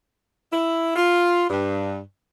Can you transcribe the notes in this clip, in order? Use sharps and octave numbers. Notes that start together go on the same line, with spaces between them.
E4
F4
G2